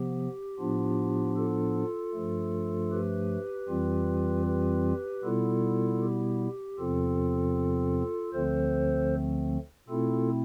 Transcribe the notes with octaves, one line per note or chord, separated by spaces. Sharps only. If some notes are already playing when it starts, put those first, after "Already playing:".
Already playing: C3 F3 B3 G4
A2 F3 B3 D4 F4
F4 A4
G2 F3 A3
G4 B4
F2 E3 G3 C4 F4
G4 B4
B2 G3 B3 E4 F4 A4
G4
E2 C3 F3 C4 F4 A4
D2 D3 F3 A3 C4 A4 C5
B2 A3 C4 E4 F4 A4